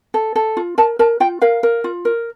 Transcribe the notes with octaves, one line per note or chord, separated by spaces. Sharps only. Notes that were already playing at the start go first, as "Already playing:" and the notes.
A4
A4
F4
A#4 A5
A#4 A5
F4 G5
A#4 F5
A#4
F4
A#4